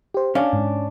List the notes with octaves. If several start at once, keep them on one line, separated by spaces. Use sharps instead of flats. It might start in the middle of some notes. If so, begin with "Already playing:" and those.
G4 C5
C#4 D4 F5
G#2